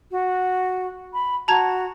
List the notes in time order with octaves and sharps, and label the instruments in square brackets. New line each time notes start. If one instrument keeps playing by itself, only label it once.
[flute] F#4
B5
[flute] F#4 [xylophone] A5 A#5 G#6